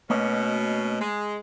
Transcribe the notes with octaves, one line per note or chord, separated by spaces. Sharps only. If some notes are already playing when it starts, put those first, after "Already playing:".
B2 A3 A#3 C#4 D#5
G#3